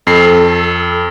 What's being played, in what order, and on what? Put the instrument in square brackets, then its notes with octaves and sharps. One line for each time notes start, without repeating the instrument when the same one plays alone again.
[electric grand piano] F2 C7 [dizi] A4